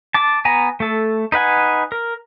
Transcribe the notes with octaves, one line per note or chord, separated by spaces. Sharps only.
A5 D6
B3 G#5 A#5
A3 A4
D#4 B4 F#5 G#5
A#4